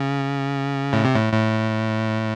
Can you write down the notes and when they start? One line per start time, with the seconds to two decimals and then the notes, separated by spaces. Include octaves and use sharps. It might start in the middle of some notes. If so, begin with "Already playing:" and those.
Already playing: C#3
0.93 A2
1.05 C3
1.15 A2
1.33 A2